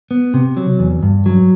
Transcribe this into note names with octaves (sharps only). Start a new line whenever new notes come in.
B3
C3
F#3
E2
G2
F#3